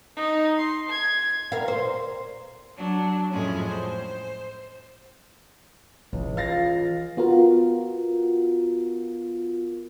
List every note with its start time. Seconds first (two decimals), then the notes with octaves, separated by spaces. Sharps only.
0.16 D#4
0.58 C6
0.89 G#6
1.52 A#4 F5
1.68 C5
2.77 F#3 D4
3.29 F2 A2 G#3 C#4
3.68 C5
6.13 C#2 E3
6.37 F4 F5 A6 A#6
7.17 B3 F4 F#4 A#4